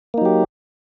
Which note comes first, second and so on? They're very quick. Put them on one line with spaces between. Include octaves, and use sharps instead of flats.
A#3 D#4 F#3 G4